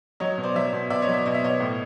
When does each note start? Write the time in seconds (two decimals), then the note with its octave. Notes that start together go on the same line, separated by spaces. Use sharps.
0.20 F#3 C#5 D#5
0.38 B2
0.43 C5 D5
0.55 F#3 D5 E5
0.73 B2
0.90 B2 D5 E5
1.02 C#5 D#5
1.08 F#3
1.14 D5 E5
1.25 B2 D#5
1.34 E5
1.43 B2 C#5 D#5
1.60 A2